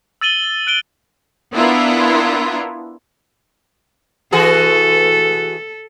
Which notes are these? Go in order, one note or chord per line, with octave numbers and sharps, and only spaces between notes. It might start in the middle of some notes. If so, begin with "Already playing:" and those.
E6 A6 D#7 F#7 G7
F#6 D7 G7
B3 D4 E4 F4 A#4
E3 F#4 G#4 A4